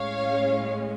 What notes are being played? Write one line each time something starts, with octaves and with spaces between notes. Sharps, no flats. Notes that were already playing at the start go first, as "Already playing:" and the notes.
Already playing: A2 G#3 C#4 C#5 F5